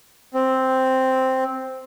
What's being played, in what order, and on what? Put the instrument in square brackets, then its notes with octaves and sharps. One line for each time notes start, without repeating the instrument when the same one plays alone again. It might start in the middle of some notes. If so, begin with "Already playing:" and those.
[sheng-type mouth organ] C4